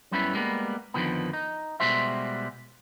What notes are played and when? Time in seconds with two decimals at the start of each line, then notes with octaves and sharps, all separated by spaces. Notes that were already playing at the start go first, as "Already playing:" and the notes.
0.11 F#2 G3 B3 C#4 E4 B4
0.33 G3 G#3 A#3 B3
0.94 F2 D3 D#3 F3 B3
1.33 D#4
1.80 B2 G3 G#3 F#4 C5 E5